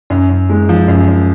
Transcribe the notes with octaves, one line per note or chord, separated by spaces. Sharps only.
F#2
F#2
G#3
F3
F#2
F#2